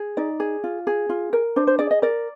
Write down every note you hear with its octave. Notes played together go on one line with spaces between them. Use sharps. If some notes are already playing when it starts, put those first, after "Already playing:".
Already playing: G#4
D#4 D5
G#4
F4
G#4
F4
A#4
D4 C5
C5
G#4 D5
D#5
A#4 D5